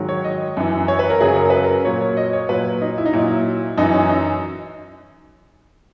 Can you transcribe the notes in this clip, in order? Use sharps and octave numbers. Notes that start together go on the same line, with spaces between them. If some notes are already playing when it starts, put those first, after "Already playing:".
Already playing: G#2 D#3 F#3
C#5
D#5
F#2 E3
C#5
B4
A#4
F#2 C#3 F#3 G#4
A#4
B4
A#4
A#2 F#3 C#5
C#5
D#5
C#5
A#2 F#3 B4
D#4
E4
D#4
A#2 F#3 E4
F#2 E3 D#4
C#4
D#4